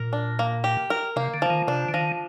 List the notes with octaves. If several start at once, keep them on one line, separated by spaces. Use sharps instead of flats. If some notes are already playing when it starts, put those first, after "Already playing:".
Already playing: A#2 A#4
D4
A#3
G4
A#4
C3 A#3
D3
F3
D#3
C3 D4
D3
D#3 F3